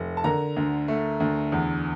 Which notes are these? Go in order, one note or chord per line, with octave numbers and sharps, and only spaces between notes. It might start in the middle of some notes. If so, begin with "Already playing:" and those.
Already playing: F1
A5
D3 A#4 A#5
D2
A3
D2
E2